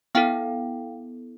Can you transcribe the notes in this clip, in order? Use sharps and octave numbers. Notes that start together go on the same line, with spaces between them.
B3 E4 A4 F5 G5